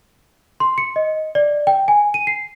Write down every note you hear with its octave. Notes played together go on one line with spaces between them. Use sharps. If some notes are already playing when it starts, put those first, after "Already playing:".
C6
C#7
D#5
D5
G5
G#5
D#7
C7